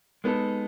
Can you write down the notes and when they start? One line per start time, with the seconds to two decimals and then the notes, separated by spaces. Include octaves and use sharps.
0.24 G#3 B3 D#4 A4